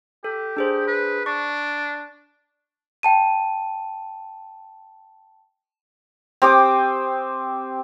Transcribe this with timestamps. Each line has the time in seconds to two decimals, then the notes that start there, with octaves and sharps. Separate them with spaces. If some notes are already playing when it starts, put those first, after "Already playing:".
0.24 G4 A4
0.57 D4 G#4 C5
0.87 B4
1.26 D4 C#6
3.03 G5 A5 D#7
6.42 C4 G4 D6 D#6